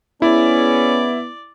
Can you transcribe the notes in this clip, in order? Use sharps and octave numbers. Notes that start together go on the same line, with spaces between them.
B3 C#4 E4 G#4 D5